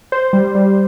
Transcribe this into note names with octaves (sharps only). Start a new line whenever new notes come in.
C5
G3
G3